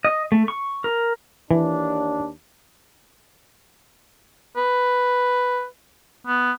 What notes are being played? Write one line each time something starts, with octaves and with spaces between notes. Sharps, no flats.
D#5
A3
C#6
A#4
D#2 E3 D4
B4
B3